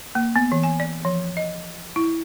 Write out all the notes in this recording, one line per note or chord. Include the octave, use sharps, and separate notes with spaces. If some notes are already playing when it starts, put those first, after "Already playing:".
A#3
B3
E3
G#5
D5
F3
D#5
E4